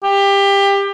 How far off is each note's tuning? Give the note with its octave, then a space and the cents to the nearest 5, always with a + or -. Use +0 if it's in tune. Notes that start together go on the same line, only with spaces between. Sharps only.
G4 +20